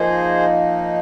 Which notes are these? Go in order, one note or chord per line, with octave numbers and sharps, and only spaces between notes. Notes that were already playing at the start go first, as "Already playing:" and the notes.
Already playing: F3 A#3 D#4 G#4 C5